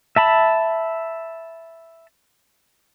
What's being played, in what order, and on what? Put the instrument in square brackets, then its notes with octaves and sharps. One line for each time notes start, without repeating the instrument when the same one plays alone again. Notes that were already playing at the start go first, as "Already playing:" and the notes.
[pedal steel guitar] E5 A5 B5